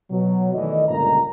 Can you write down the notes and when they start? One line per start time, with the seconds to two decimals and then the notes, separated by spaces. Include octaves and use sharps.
0.10 B2 F#3
0.54 E2 D#3 E3 A3 D5 D#5
0.89 G1 C#2 F#2 A#2 A#4 A#5